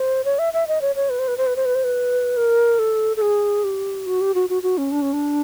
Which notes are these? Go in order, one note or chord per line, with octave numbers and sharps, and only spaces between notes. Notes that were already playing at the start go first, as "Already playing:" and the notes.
Already playing: C5
C#5
E5
E5
D#5
C#5
C#5
B4
C5
B4
C5
B4
C5
B4
C5
B4
A#4
A4
A4
G#4
G4
F#4
G4
F#4
F#4
F#4
C#4
D4
C#4
D4